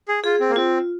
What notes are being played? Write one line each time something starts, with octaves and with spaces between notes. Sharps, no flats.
G#4
F4 G#4
C4
A#3
C4 F4